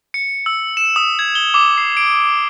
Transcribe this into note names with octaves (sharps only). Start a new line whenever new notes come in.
C#7
E6
E7
D#6
G#6
G7
D6
C7
D7